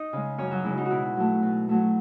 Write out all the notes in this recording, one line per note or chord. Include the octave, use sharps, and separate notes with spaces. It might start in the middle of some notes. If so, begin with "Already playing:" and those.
Already playing: D#4 D#5
C#3 G#3
F#2 C#4 C#5
F#3 F#4
C#3 G#3 E4
D#4
F#4
B2 E4
F#3 A3
B2
F#3 A3